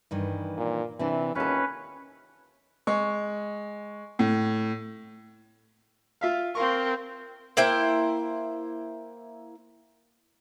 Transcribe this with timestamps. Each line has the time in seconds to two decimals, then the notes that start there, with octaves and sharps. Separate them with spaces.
0.11 G2 D#3 E3
0.57 A#2
0.99 C3 E3 C4 D4
1.35 D#2 C#4 F4 A4 B4
2.87 G#3 C#6
4.19 A2
6.21 F4 E5 F5
6.55 C4 A#4 F5 C6 C#6
7.57 A#3 E4 C5 G5